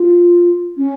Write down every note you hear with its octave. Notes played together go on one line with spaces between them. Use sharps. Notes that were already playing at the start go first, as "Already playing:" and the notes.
Already playing: F4
C#4